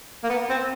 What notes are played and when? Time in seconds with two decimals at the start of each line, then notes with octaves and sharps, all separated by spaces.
0.23 A#3
0.29 B3
0.49 C4